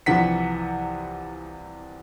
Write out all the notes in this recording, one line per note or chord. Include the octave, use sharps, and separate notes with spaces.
C2 C3 E3 F3 F#5 B6